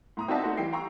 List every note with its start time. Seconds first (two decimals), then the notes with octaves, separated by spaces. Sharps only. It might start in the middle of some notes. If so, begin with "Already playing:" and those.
0.17 A2 A#5 D#6
0.28 C4 D#4 F#4 D5 E5 A5
0.42 A3 D#4 F#4 A4 C5
0.57 E3 G3 G5 C7
0.72 F5 G5 A#5 C#6 E6